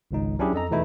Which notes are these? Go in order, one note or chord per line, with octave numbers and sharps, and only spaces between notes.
G#1 C#2 D#4
F#3 C#4 D4 E4 G4 G#4
F2 A4 D#5 A#5
E2 B2 E3 A3 D#4 E4